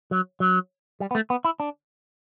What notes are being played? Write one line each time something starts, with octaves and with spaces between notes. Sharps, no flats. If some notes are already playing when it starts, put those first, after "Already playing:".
F#3
F#3
G3
B3
A3
B3
E4
D4